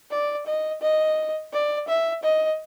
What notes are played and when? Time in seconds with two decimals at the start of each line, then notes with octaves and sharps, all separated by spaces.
0.11 D5
0.46 D#5
0.81 D#5
1.53 D5
1.88 E5
2.23 D#5